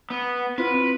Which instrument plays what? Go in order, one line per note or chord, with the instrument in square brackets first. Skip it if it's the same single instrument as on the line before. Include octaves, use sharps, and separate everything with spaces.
[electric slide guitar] B3
[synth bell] C4 E4 F4 [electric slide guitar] B4
[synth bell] C4